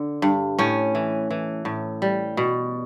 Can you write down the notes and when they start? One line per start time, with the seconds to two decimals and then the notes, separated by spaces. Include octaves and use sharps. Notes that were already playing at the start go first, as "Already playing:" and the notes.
Already playing: D3
0.22 G2
0.59 A2 C#4
0.95 E3
1.31 E3
1.65 A2
2.02 G3
2.37 B2